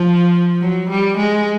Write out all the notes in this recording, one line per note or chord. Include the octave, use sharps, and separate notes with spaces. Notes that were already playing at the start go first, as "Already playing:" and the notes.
Already playing: F3
F#3
G3
G#3